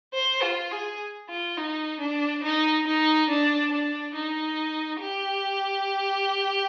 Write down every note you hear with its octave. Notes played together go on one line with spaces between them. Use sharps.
C5
F4
G#4
F4
D#4
D4
D#4
D#4
D4
D4
D#4
G4